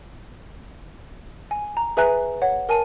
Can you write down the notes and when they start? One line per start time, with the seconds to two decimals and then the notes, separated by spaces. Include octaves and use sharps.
1.51 G#5
1.77 A#5
1.97 G#4 B4 E5 G#5 A#5 F#6
2.42 C#5 F#5
2.69 A#4 G#5 A5 D#7